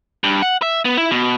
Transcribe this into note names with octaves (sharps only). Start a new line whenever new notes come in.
G2
F#5
E5
B3
E4
B2